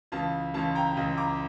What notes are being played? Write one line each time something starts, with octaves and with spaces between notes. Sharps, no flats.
C#2 C#3 E3 F5 A5
C#2 C#3 E3 F5 A5
G5 A#5
C#2 C#3 E3
A#5 D6